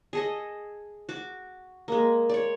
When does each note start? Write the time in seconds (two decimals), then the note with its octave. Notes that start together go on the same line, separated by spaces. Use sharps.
0.13 G#4 A4 D#5
1.09 F#4 D6
1.88 G#3 A#3
2.29 C#5 D5